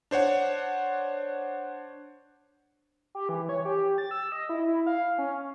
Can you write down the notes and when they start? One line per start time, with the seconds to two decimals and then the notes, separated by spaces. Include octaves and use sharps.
0.11 D4 C5 C#5 F#5
3.15 G4
3.29 E3
3.49 C#5
3.65 G4
3.98 A6
4.11 E6
4.32 D#5
4.49 E4
4.68 E4
4.87 F5
5.18 C#4